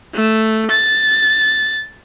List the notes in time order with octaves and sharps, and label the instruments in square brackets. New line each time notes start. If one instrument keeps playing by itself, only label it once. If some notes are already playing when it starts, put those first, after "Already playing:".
[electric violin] A3
A6